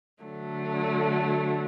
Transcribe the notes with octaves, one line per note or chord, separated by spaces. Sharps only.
D3 F#3 A3